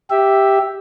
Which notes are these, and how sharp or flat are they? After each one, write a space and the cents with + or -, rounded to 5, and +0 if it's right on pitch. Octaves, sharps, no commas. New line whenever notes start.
G4 +0 E5 +0